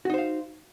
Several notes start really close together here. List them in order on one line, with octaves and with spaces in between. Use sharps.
F#4 D#4 C5 F5